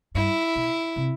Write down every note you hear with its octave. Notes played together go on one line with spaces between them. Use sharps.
G2 E4
B2
C3